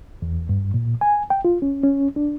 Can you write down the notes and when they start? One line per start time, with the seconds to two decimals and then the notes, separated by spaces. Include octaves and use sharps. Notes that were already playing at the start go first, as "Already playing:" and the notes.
0.22 E2
0.49 G2
0.74 A#2
1.01 G#5
1.30 G5
1.45 F4
1.62 C#4
1.83 C#4
2.16 D4